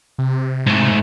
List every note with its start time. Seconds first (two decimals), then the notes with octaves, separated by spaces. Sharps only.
0.18 C3
0.67 G#2 A3